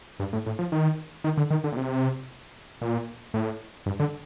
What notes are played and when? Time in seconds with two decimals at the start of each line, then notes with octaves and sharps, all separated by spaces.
0.20 G2
0.33 A2
0.46 A2
0.59 F3
0.72 D#3
1.24 D#3
1.37 D3
1.50 D#3
1.64 D3
1.72 A#2
1.77 C3
2.82 A#2
3.34 A2
3.86 G2
3.99 D3